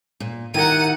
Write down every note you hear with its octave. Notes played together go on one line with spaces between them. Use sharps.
A#2
D#3 E4 G4 A#4 F#5 D#7